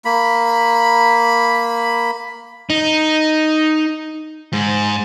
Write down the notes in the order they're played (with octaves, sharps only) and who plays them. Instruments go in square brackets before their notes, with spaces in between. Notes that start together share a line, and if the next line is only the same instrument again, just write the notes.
[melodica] A#3 B5
[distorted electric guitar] D#4
G#2